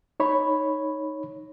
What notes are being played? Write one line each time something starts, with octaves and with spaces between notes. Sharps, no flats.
D#4 C#5 B5